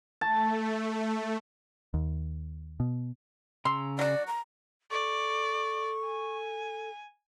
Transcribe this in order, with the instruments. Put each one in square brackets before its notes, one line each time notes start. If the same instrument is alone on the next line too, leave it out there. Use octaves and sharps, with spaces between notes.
[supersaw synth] A3 [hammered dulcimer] A5
[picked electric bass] D#2
B2
[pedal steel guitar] C#3 A#5 E6 [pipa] C6
[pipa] F#3 F#4 [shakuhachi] D5
[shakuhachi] A#5
[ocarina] A4 [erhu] D5 [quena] C#6
[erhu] G#5